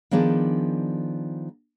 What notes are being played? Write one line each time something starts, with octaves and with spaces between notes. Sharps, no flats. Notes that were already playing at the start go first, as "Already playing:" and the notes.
D#3 F3 B3 D4 G#4 D5